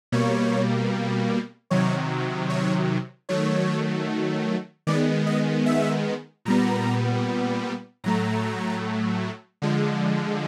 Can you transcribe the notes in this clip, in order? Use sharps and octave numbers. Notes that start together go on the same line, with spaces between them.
B2 G3 A#3 C#5
C3 D#3 F#3 C#5
C#5
D#3 F#3 A3 C#5
D#3 G#3 B3 D5
D#5
E5
A#2 G3 B3 A#5
A2 F#3 A3 A#5
D3 F3 G#3